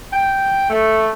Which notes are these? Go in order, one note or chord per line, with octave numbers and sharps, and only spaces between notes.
G5
A3